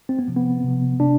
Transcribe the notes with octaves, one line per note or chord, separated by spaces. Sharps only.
C4
B3
C3 F3
B3
C3 F3
C3 D4